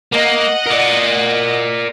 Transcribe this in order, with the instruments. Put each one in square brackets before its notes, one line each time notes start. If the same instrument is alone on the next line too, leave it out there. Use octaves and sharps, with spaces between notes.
[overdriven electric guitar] A#3 [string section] D#5 F#5
[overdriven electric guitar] A#4 D5